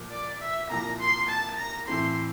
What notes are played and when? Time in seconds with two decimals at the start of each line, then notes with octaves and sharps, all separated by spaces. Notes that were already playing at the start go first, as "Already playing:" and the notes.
Already playing: A#2 F3 A#3
0.11 D5
0.41 E5
0.70 C2 A#2 F3 A#5
1.00 C6
1.29 A5
1.58 A#5
1.87 A2 E3 A3 C4 C6